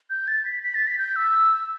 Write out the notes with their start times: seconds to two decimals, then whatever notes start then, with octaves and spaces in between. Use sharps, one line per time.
0.10 G6
0.28 A6
0.45 B6
0.63 B6
0.75 A6
0.87 B6
0.98 G6
1.16 E6